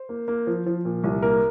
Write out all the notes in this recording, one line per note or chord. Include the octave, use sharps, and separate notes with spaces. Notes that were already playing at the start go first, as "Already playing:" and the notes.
Already playing: C5
A#3
A#3
F3
F3
A#2
C2
A#3 A#4